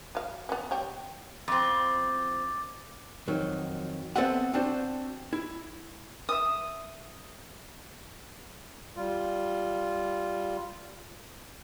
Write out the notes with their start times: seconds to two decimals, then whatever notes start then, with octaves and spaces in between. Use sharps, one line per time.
0.15 F#3 F5
0.49 B3 C#4
0.71 G3 C#5 G5
1.48 F2 C4 D6 A6
3.28 F2 D#3 F#3
4.16 B3 C4 A4 B4 E5 F#5
4.54 C4 D4 F#4 C5
5.33 E4
6.29 E5 D#6
8.95 G3 F4